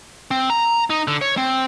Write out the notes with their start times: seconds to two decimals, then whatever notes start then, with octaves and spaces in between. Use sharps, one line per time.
0.31 C4
0.50 A#5
0.90 D#4
1.08 D3
1.21 C#5
1.37 C4